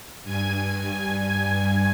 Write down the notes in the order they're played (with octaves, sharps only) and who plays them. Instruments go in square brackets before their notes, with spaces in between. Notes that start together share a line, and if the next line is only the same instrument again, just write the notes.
[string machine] G2 G#5 G#6